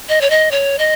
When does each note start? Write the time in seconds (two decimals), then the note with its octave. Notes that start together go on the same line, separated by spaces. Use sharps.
0.09 D#5
0.21 C#5
0.30 D#5
0.51 C#5
0.79 D#5